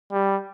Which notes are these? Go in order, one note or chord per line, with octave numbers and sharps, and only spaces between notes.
G3